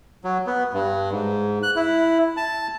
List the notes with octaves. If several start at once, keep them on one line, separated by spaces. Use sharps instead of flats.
F#3
B3
G2
G#2
F#6
E4
A5